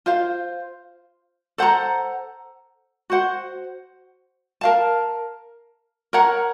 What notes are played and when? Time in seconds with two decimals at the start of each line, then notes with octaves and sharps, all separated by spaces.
0.06 F4 C5 F5
1.58 A4 C5 F#5 A#5
3.10 F#4 C5 F#5
4.61 A#4 F5 A5
6.13 A#4 C#5 F#5 A#5